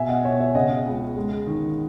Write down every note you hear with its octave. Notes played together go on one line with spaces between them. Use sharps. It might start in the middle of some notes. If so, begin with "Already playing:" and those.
Already playing: B2 E5 G#5
D#5 F#5
B2 C#5 E5
C#5 E5
C#3 D#5 F#5
C#2
G#3
D#3